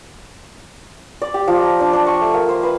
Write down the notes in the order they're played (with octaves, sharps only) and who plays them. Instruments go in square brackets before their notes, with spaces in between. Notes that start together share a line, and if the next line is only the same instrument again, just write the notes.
[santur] D5
G4
F3
A#5
D4
D4
C#6
A3
A#3
C5
B4